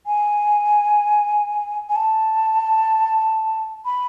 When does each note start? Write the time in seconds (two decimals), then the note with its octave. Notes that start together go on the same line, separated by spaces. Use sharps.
0.07 G#5
1.89 G#5
1.96 A5
3.85 B5